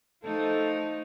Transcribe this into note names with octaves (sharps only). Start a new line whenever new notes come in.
F3 A3 D#4 A4